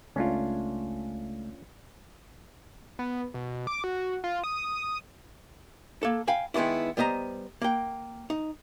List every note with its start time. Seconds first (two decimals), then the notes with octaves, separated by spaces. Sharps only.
0.16 C#2 A3 C#4 D4 F4
2.99 B3
3.34 B2
3.67 D6
3.84 F#4
4.24 F4
4.44 D#6
6.03 A#3 A4
6.27 F5 G5 G#5 B5
6.54 D#3 G#3 B3 D4 E4
6.97 G3 B3 C5 D#5 A#5
7.62 A#3 G5
8.30 D#4